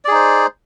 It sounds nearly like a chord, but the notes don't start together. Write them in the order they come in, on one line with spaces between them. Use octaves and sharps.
D5 G#4 D#4 C5